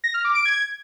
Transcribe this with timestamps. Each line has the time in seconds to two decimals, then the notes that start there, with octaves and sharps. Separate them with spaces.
0.04 A#6
0.14 F6
0.25 D6
0.35 D7
0.45 G#6